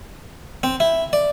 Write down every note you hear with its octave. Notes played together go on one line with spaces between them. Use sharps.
C4
E4
D5